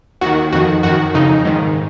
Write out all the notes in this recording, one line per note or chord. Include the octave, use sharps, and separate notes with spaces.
D#2 D#3 F#4
F2 D#3 F#4
F#2 D#3 F#4
F2 C#3 D#4
G#2 D#3